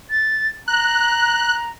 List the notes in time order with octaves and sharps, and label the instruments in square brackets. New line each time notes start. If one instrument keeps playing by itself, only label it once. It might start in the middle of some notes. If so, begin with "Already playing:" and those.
[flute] A6
[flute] A#5 [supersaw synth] F#6